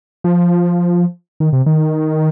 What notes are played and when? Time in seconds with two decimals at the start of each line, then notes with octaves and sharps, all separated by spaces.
0.24 F3
1.40 D#3
1.53 C3
1.66 D#3